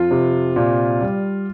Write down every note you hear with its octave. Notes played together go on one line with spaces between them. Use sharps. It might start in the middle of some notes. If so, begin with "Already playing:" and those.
Already playing: F2 F4
C3
A#2
G3